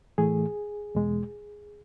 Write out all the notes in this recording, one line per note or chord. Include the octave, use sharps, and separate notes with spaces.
A2 E3 A3 G#4
E2 B2 G#3